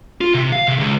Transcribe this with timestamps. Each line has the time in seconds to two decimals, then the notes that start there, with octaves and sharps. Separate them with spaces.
0.21 F4
0.34 C3
0.52 F5
0.68 C3
0.79 C#2